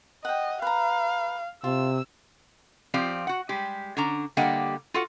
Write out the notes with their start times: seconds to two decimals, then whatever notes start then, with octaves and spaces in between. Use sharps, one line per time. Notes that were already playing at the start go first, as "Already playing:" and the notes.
0.25 D#5 F#5 G5
0.62 B4 F5 A#5
1.64 C3 F4 E6
2.94 F3 C4 F4 G4 D5
3.27 F#4 F#5
3.49 G3 G#3 G4
3.97 D3 C#4 D4 A#5
4.37 D3 G3 A#3 G4 D#5 F#5
4.94 F4 F#4 A4 F#5